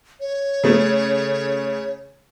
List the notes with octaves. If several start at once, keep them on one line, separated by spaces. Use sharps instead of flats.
C#5
C#3 A3